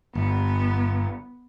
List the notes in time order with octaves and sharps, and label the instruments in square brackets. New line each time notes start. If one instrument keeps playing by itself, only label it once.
[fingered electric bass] G1 [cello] B3